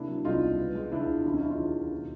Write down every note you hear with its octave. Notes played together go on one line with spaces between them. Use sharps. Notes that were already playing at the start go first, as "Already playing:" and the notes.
Already playing: C3 A#3 D4 E4
F#3
C2 D#4 F4
B2
B3
G#3
C#2 D4 E4
B2
D#2 D4 E4
C#4 D#4
F#3 D4 E4
D#4 F4
D#2
D#3
B2